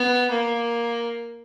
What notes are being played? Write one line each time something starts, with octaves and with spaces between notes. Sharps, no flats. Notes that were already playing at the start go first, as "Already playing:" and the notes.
Already playing: B3
A#3